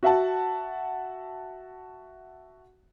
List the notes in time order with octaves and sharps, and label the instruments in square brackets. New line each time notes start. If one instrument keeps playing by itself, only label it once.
[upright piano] F#4 E5 F#5 A5